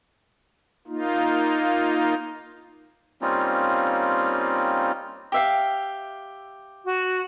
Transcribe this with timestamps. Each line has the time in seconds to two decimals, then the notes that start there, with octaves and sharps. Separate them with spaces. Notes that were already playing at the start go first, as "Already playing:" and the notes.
0.88 A#3 D#4 F4
3.22 G3 A#3 C4 C#4 D#4 F4
5.32 G4 E5 F5
6.85 F#4